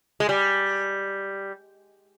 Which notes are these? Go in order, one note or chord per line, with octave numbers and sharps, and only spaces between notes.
G#3
G3